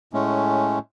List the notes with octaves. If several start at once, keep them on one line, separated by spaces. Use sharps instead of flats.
A2 G#3 A3 C#4